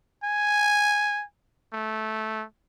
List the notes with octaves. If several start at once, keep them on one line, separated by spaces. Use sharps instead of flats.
G#5
A3